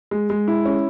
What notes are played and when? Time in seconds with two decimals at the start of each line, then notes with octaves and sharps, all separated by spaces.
0.11 G#3
0.30 G#3
0.48 E4
0.65 C#4